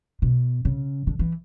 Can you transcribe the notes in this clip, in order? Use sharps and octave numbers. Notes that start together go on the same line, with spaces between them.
B2
C#3
D3
E3